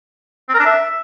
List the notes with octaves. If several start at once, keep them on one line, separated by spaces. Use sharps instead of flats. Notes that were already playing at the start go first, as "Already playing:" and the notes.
C4
A#4
D4
E5